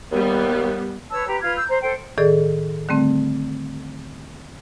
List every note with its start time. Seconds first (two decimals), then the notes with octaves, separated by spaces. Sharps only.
0.11 D#2 G3 B3
1.10 B4 C#5 A5 E6
1.26 G4 B4 A#5
1.42 F4 B4 F6 G#6
1.56 E6 G6
1.68 C5 A#5
1.81 A4 C5 G5
2.18 A2 D#3 G#4 A4 D5
2.89 D3 G3 A3 C4